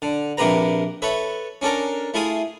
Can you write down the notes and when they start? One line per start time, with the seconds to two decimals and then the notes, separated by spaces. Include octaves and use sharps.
0.02 D3
0.37 A#1 C3 A#3 G4 B4 A#5
1.02 A4 B4 C#5 E5
1.61 C#4 D4 A4 A#4
2.14 A3 E4 F4 G#4 D#6